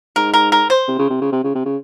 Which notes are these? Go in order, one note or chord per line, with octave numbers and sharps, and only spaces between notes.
G#2 A#4
A#4
A#4
C5
C3
C#3
C3
C#3
C3
C#3
C3
C#3